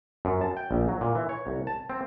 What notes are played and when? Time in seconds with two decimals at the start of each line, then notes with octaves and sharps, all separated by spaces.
0.25 F#2
0.41 A5
0.57 G5
0.71 A#1
0.89 F#3
1.01 A#2
1.15 E3
1.29 C#5
1.47 C2
1.67 A5
1.90 C4